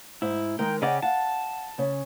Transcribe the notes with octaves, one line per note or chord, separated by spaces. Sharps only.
G#2 E4
D#3 G#3 A#4 G5
C#3 C#4 D5 D#5 F#5 G5
F5 F#5 A5
C#3 C#4